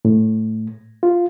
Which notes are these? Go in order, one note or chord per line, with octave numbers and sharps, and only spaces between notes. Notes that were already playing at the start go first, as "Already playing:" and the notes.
A2
F4